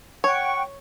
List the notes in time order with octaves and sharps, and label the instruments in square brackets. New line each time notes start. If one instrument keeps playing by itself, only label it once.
[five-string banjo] C#5 [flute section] F#5 G5 C#6